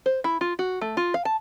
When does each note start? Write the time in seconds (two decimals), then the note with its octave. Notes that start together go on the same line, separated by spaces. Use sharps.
0.06 C5
0.24 E4
0.41 F4
0.59 F#4
0.81 A3
0.97 F4
1.14 F5
1.25 A5